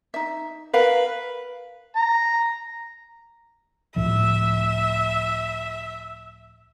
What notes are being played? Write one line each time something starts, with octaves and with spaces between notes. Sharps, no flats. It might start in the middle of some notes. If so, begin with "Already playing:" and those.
D#4 E5
A#4 B4 F5
A#5
C#2 A2 F3 E5